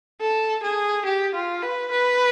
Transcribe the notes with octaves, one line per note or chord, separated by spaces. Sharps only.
A4
G#4
G4
F4
B4
B4